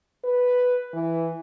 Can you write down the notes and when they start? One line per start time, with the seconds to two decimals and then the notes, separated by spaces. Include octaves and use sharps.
0.24 B4
0.94 E3